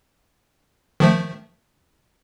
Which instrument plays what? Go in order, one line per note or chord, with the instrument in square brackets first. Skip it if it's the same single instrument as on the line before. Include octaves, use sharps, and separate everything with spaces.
[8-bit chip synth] D#3 F3 A3